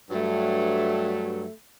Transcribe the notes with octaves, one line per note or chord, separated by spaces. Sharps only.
G2 F#3 A3